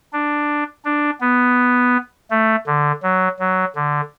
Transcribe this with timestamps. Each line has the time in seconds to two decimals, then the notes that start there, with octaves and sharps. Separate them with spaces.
0.13 D4
0.85 D4
1.21 B3
2.30 A3
2.67 D3
3.03 F#3
3.39 F#3
3.76 D3